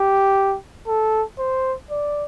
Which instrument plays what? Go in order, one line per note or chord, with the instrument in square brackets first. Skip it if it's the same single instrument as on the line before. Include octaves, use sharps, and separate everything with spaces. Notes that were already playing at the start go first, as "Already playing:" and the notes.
Already playing: [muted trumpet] G4
A4
C5
D5